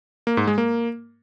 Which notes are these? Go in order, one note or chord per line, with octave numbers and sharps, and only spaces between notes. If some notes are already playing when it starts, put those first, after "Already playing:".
A#3
G#2
G#3
A#3